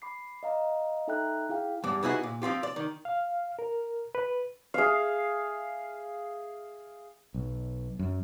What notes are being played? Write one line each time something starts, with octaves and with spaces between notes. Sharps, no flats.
B5 D6 C7
D#5 F5 A#5
D#4 A4 E5 G5 A#5 F#6
E4 G#4 F5 G5
E2 G2
B3 D#4 E4 F#4 G#4
A#2
F3 C4 F4 G4
D5
D#3
F5
A#4
B4
G#4 E5 F5
B1
F#2